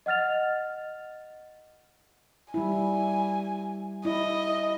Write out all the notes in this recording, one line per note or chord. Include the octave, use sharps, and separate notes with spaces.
D#5 F#5 F6 A6 F7
G3 E4 G#5
E4 D#5